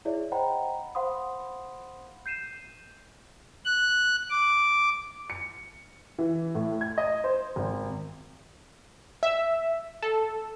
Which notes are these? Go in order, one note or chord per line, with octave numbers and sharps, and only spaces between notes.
E4 G#4 C#5 D5 E5
C5 D#5 F#5 G5 A#5 B5
C5 F5 F#5 B5 C6 D#6
G6 C7 D#7 E7
F#6
D6
C#7
E3
A2
G#6
D#5
C5
G#1
E5
A4